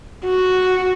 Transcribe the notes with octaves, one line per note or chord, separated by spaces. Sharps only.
F#4